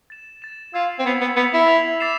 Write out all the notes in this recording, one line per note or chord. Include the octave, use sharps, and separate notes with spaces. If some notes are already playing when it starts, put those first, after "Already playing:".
A6 E7
A6 E7
F4 E6 G#6 C7 F7
C4
B3 E6 G#6 C7 F7
B3
B3 E6 B6 F7
E4
E6 B6 F7
D6 A6 C7 E7